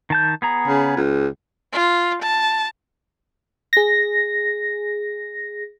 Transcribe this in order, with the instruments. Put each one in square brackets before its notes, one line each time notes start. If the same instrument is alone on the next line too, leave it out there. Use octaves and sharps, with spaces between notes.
[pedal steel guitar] D#3 A5 G6
B3 G#4 A#5
[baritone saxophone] C#3
C#2
[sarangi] F4
A5
[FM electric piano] G#4 A#6